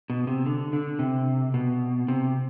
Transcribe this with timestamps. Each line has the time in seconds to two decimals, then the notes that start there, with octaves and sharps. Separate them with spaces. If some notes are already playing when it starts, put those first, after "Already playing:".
0.10 B2
0.27 C3
0.46 D3
0.73 D3
0.99 C3
1.54 B2
2.08 C3